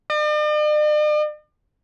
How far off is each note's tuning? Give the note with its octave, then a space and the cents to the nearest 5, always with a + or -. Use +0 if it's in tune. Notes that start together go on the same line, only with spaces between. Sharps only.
D5 +45